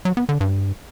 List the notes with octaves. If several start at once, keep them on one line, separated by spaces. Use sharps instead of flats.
F#3
B3
D3
G2